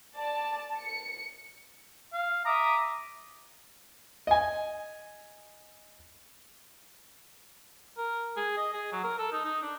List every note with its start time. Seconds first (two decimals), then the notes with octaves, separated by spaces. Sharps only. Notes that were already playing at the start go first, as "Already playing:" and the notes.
0.17 D5 A5
0.79 C#7
2.13 F5
2.45 E5 A#5 D6 D#6
4.27 D#5 G#5
7.97 A#4
8.37 G#4
8.57 D#5
8.73 G#4
8.92 F#3
9.04 A#4
9.19 A4
9.32 D#4
9.45 D#4
9.62 D4